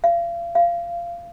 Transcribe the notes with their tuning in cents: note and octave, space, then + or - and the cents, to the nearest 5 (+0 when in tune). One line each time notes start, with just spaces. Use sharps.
F5 -35
F5 -20